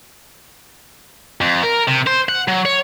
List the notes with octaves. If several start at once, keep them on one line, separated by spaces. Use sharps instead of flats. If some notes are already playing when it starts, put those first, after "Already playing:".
F2
A#4
C3
C5
F#5
F#3
C#5